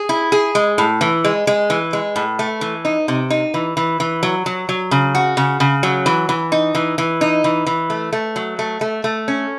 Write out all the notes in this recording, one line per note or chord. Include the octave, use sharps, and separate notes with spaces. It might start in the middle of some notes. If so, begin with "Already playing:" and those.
Already playing: G#4
E4
G#4
G#3
A2
E3
G#3
G#3
E3
G#3
A2
A3
E3
D#4
C3
D#4
E3
E3
E3
F#3
F#3
F#3
C#3
F#4
C#3
C#3
F#3
E3
E3
D#4
E3
E3
D#4
E3
E3
A3
A3
F#3
A3
A3
A3
C#4